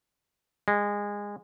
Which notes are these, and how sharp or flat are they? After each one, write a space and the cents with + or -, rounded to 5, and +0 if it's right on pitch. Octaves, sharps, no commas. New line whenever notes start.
G#3 -20